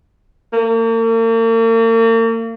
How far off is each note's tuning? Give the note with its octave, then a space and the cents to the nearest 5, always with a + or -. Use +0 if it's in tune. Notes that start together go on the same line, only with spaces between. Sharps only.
A#3 -40